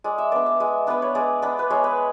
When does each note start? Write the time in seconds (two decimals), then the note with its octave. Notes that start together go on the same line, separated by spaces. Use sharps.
0.04 G#3 D5
0.18 E5
0.32 B3 D4 D5
0.46 E5
0.60 G#3
0.87 B3 D4 B4
1.02 C#5
1.15 G#3 D5
1.42 B3 D4
1.59 B4
1.70 G#3 C#5
1.84 B4